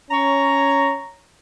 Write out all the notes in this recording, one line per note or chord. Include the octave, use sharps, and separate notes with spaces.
C#4 C#5 A#5